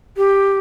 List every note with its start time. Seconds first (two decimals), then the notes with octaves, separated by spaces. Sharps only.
0.17 G4